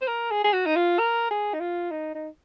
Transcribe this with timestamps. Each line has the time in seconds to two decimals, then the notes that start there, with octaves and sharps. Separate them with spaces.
0.01 C5
0.08 A#4
0.31 G#4
0.44 G#4
0.53 F#4
0.66 D#4
0.76 F4
0.99 A#4
1.31 G#4
1.54 D#4
1.60 F4
1.91 D#4
2.15 D#4